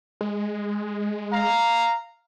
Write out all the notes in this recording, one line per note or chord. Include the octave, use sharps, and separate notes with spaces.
G#3
F5 A#5